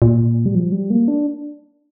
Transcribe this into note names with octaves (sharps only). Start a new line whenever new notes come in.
A#2
G3
F3
G3
A#3
D4